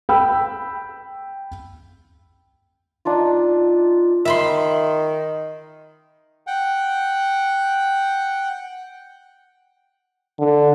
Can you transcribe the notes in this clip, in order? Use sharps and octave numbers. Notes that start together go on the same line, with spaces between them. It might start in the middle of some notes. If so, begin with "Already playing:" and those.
G5 B5 E6
D4 D#4 F4
D#3 E5 B5 C6
F#5 G5
D3